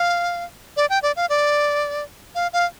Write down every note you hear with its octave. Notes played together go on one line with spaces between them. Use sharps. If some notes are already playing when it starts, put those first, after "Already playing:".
Already playing: F5
D5
G5
D5
F5
D5
F5
F5